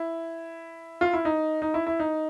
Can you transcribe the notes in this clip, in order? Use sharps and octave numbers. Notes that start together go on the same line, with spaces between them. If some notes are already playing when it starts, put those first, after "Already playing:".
Already playing: E4
F4
E4
D#4
D#4
E4
E4
D#4